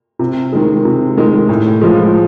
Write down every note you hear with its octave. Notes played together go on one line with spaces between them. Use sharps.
C3
D#3 G#3
C3
D#3 G#3
A2
F3 G#3